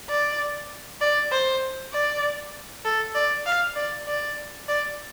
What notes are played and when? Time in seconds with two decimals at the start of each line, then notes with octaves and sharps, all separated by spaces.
0.09 D5
1.01 D5
1.32 C5
1.93 D5
2.85 A4
3.15 D5
3.46 F5
3.76 D5
4.07 D5
4.68 D5